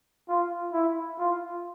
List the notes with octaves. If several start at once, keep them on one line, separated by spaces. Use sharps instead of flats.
F4
E4
F4